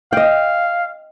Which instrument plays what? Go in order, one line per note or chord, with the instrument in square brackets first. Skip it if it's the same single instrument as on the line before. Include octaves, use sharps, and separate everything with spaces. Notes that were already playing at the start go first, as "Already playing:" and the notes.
[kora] D#5 G5 [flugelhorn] F5